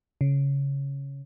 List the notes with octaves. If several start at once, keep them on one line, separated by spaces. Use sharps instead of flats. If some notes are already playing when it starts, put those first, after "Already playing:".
C#3